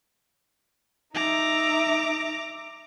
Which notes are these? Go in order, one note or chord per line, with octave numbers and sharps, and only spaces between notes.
D#4 E5 A#5 D6